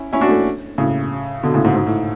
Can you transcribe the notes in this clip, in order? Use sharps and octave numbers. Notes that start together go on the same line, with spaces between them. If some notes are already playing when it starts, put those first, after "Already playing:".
Already playing: C#4 E4
C#4 E4
D4 F#4
A3 C#4
A2 C#3
B2 D3
A2 C#3
G#2 B2
G#2
A2